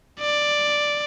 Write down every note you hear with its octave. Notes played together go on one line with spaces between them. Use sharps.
D5